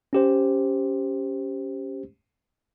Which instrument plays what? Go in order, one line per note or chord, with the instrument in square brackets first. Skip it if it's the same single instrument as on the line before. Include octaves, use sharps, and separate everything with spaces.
[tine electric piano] C#4 G4 C5